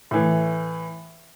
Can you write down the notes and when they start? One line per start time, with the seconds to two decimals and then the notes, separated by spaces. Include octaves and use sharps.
0.11 A2 E3